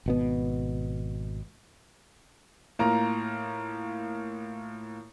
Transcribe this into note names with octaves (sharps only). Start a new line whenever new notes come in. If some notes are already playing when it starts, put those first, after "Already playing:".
G#1 B2 B3
A2 A#3 F4 A#5